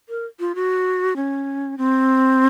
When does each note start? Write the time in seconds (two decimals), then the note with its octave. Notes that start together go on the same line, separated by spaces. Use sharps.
0.09 A#4
0.40 F4
0.55 F#4
1.16 C#4
1.78 C4